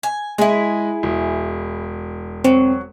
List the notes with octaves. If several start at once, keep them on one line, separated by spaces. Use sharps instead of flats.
G#5
G#3 E4 G#4
E1
F#3 C4